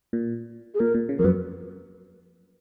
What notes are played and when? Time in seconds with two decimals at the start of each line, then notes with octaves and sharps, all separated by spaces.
0.13 A#2
0.74 G#4
0.79 A#2 A#4
0.94 A#2
1.09 C#3
1.19 F2 A#4
1.24 F#2 B4